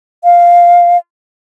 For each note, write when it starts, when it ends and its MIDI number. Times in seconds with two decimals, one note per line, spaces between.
0.24 0.97 77